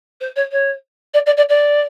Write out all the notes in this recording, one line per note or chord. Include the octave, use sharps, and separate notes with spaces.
C5
C#5
C#5
D5
D5
D5
D5